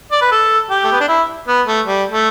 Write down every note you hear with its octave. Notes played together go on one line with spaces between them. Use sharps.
D5
B4
A4
G4
A3
B3
D4
E4
B3
A3
G3
A3